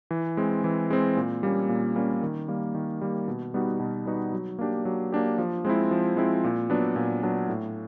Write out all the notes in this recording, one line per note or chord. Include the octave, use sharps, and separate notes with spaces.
E3
G#3 C4
E3
G#3 C4
A#2
G3 A#3 C#4
A#2
G3 A#3 C#4
D#3
G3 A#3
D#3
G3 A#3
B2
G3 B3 D#4 F#4
B2
G3 B3 D#4 F#4
F#3
A#3 D4 G4
F#3
A#3 D4 G4
F3
G#3 C4 E4
F3
G#3 C4 E4
A#2
F#3 B3 D4
A#2
F#3 B3 D4
A2